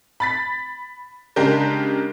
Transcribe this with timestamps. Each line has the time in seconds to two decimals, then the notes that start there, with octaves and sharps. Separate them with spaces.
0.20 B5 A6 B6
1.36 C#3 G#3 D4 G4 A#4